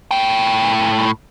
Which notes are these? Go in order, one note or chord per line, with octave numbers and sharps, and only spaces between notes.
A2 G5